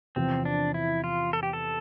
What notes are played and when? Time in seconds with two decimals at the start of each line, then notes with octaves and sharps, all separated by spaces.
0.16 E2 C3 F3 C4
0.45 D4
0.74 E4
1.04 F4
1.33 A4
1.43 G4
1.53 A4